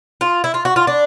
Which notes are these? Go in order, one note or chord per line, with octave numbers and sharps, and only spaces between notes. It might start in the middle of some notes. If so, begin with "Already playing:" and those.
F4
E4
F4
F#4
F4
D4